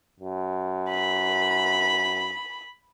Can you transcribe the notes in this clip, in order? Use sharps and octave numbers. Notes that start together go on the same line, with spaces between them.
F#2
B5